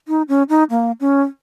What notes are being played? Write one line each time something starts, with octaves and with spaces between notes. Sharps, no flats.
D#4
C#4
D#4
A#3
C#4